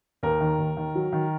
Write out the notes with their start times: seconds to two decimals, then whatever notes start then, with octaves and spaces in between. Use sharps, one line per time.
0.23 D#2 A#4
0.40 D#3
0.58 D#2
0.77 D#3
0.95 F#3
1.13 D#3